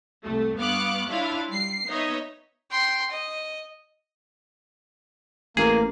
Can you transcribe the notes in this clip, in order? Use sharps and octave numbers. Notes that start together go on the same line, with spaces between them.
C2 A3
G2 B3 F5 C#6 D6 F#6
D4 E4 F4 C#5 F5
G3 C7
B3 D#4 C#5 D#5 E5
G5 C6
D#5
A1 A#3 G#4